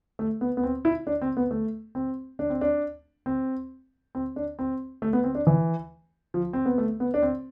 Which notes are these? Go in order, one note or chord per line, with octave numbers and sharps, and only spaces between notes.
A3
B3
B3
C4
E4
D4
C4
B3
A3
C4
D4
C4
D4
C4
C4
D4
C4
A3
B3
C4
D4
E3
F3
C4
B3
A3
B3
D4
C4